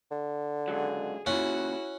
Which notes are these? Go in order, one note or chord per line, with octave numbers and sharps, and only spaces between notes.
D3
C#2 F#3 G#4
A#2 C#3 C#4 E4 F#4 F#5